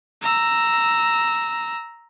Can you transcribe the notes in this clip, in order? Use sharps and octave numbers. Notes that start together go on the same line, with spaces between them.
A#5 E6